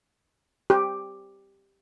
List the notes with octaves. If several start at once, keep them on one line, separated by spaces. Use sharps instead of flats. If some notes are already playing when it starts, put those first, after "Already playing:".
G4